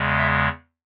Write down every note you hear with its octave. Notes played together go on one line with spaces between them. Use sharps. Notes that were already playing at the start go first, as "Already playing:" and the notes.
Already playing: E2 C#3 G#3
E5